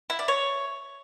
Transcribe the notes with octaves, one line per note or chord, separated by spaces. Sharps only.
E4
D5
C#5